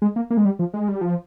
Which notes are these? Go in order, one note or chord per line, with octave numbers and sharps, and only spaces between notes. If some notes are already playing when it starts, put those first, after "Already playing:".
G#3
A#3
A#3
G#3
G3
F3
G#3
G3
F3